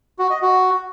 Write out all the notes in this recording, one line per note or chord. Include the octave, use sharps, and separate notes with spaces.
F#4
D#5
F#4